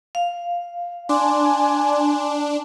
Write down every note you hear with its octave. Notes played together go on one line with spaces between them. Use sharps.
F5
D4 G#5 C6 D6